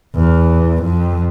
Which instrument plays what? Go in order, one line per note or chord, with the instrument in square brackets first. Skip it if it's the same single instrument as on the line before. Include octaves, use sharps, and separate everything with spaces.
[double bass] E2
F2